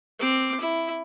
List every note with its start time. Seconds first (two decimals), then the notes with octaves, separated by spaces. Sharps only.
0.19 C4 D6
0.61 E4